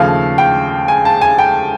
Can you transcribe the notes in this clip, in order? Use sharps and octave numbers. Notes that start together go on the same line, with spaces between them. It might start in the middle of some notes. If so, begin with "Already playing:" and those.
Already playing: D#2 C#3 F3 A3 F5
G5
G#5
A5
G#5
G5